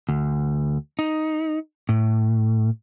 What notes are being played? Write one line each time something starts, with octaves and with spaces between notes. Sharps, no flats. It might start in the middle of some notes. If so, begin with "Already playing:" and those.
D2
D#4
A2